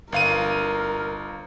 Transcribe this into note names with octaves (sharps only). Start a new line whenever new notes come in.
G1 A#4 F5 D#7